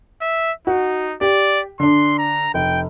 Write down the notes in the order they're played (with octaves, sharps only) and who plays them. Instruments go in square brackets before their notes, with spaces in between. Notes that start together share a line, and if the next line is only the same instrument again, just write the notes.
[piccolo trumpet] E5
[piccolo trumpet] D#4 [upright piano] F#4
[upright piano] G4 [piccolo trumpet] D5
[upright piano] D3 D4 [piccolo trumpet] C6
[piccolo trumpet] A#5
[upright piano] F1 [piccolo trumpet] G5